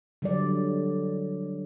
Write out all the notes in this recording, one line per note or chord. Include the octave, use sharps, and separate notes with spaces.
D3 F#3 G3 D5